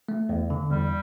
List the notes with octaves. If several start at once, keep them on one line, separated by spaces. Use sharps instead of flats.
A3
E2
D3
E2 G3